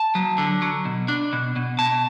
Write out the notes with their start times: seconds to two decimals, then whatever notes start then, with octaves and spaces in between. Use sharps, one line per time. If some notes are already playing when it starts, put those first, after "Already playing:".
Already playing: A5
0.15 F#3
0.38 D3
0.62 F#3
0.85 B2
1.08 D4
1.33 B2
1.56 B2
1.79 B2 A5